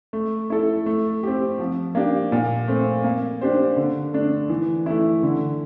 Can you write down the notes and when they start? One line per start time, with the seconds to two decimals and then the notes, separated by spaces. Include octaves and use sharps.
0.13 A3
0.50 E4 A4
0.86 A3
1.23 C4 G4
1.59 F3
1.95 A#3 D4 G4
2.32 A#2
2.68 A3 C4
3.04 A#3
3.41 D4 G4 C5
3.77 D3
4.13 A3 D4
4.49 E3
4.86 A3 E4
5.23 D3